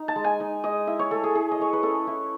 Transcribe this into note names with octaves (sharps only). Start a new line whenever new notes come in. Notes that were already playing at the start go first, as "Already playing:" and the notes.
Already playing: D#4
A5
G#3
G#5
D#4
G#3 D#5
E4 E5
C#5
A3 A4
G#4
E4 G#4
D#5
A3 C#5
B4
C#4 A4
E4